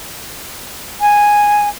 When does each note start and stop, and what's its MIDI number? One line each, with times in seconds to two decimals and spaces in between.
1.01 1.69 80